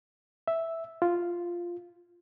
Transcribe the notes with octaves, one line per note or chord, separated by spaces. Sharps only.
E5
F4